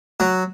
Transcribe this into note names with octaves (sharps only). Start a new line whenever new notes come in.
F#3